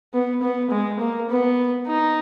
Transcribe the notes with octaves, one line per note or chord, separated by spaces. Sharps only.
B3
B3
G#3
A#3
B3
D#4